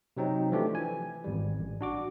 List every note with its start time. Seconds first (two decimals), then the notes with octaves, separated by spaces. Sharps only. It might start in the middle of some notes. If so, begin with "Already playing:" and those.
0.17 C3 F#3 C4 D#4
0.52 E3 F3 A3 D4 G4
0.75 E3 G#5
1.24 G#1 G3
1.58 A1
1.81 D4 F#4 D6